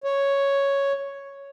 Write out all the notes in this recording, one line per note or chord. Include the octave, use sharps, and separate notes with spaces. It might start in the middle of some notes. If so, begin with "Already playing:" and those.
C#5